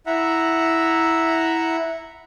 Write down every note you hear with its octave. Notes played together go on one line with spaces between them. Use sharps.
E4 E5 F#5 A#5